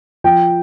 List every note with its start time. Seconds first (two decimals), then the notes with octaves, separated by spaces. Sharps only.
0.24 F3 G5